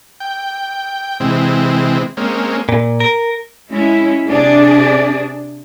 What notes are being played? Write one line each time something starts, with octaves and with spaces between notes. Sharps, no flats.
G5
C3 E3 G#3 C4
G#3 A#3 C4 C#4
A#2
A#4
G#3 C#4 E4
C3 D4 G#4 D5